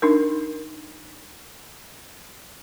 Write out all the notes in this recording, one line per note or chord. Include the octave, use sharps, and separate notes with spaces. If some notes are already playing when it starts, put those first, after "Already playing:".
D4 D#4 A#4